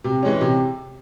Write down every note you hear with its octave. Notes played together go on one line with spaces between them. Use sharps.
C3
E3 G#3 C#4
C3